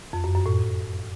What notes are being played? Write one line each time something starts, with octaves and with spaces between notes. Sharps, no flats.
F2
F#2
F#2
A2